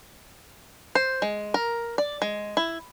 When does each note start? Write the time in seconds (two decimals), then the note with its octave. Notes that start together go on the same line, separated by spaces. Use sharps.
0.95 C5
1.22 G#3
1.54 A#4
1.98 D5
2.22 G#3
2.57 E4